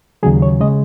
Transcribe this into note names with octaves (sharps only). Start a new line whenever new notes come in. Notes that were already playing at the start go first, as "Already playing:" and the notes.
D#2 C#3 F#3 G#4
C#5
C#3 G#3 D#5